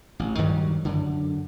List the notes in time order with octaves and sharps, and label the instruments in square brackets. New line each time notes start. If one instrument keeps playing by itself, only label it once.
[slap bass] A1
G2 D#3 F#3 G3
F#2 D3